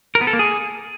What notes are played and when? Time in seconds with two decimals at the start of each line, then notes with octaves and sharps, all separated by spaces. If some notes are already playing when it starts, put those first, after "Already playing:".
0.15 A#4
0.21 B3
0.27 A4
0.33 A#3
0.39 G#4